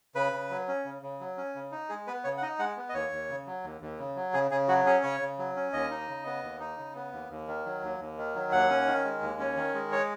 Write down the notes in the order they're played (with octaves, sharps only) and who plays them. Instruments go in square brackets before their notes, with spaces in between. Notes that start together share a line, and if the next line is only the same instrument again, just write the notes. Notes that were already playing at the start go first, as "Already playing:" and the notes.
[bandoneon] C#3 B4
C#3
F#3
C#4
C#3
C#3
F#3
C#4
C#3
D#4
G#3 G#4
B3 B4
C#3 C#5
F#5
D#4 D#5
G#3 F#5
B3
D#5
D#2 C#5
D#2
C#3
F#3
D#2
D#2
C#3
F#3
C#3 G#4
C#3 G#4
F#3 F#4
C#4 G#4
C#3 C#5
C#3
F#3
C#4
D#2 D#5
D#4
C#3
B3
D#2
D#4
C#3
B3
D#2
D#2
D#3
F#3
D#2
D#2
D#3
F#3
D#2 F#5
C#4
D#3
G#3
D#2
C#4
D#3
G#3
C#5